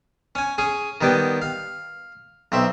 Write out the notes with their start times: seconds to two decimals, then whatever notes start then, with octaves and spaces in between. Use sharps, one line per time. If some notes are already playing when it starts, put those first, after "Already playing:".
0.35 C#4 G#5
0.58 C#4 G#4
1.01 D#3 G3 B3 G4
1.42 F5
2.52 B1 C4 E5